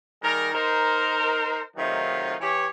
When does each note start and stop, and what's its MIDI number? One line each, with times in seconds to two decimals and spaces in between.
0.22 0.54 51
0.22 0.54 55
0.22 0.54 68
0.22 0.54 70
0.54 1.62 63
0.54 1.62 70
0.54 1.62 72
1.77 2.35 48
1.77 2.35 51
1.77 2.35 54
1.77 2.35 57
1.77 2.35 63
1.77 2.35 65
2.40 2.66 52
2.40 2.66 67
2.40 2.66 73